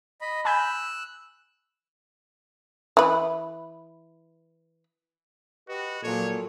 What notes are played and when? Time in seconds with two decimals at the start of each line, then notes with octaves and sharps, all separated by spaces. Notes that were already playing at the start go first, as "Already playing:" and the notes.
0.21 D#5 B5
0.45 G#5 B5 E6 F#6 G6
2.97 E3 B4
5.69 F#4 G4 B4 D#5
6.03 A#2 F3 F#3 A4 C#5